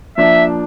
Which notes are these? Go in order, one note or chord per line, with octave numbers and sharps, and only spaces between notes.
F3 A#3 D4 E5